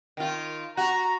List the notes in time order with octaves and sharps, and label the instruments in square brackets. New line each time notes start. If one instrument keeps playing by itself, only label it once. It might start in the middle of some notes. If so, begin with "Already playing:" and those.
[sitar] D#3 F4
[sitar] F#4 [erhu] A#5